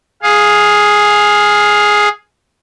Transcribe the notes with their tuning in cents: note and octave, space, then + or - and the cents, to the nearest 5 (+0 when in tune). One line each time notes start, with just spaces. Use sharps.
G#4 +0 F5 +15